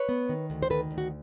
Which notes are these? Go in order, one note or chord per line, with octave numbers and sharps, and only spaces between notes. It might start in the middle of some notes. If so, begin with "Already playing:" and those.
Already playing: B4 C#5
B3
D#3
D2
C5
D#3 A4 B4
D2
F#4